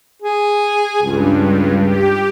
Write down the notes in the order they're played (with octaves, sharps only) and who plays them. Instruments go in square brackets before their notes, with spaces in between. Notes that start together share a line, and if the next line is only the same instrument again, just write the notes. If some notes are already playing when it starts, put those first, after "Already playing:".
[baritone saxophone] G#4
[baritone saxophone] C#2 [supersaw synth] G2
[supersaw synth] G4